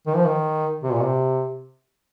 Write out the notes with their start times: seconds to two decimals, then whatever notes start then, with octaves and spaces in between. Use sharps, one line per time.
0.07 D#3
0.16 F3
0.26 D#3
0.83 C3
0.93 A#2
1.02 C3